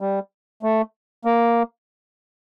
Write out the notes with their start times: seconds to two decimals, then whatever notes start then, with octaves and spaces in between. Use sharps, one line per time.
0.01 G3
0.63 A3
1.25 A#3